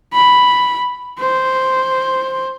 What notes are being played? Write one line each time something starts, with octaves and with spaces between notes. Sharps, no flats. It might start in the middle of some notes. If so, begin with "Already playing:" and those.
B5
C5